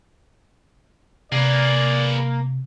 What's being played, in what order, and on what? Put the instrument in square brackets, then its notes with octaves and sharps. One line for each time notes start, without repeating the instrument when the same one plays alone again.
[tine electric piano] C3 [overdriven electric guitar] A#3 [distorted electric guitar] G#4 B4 [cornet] D5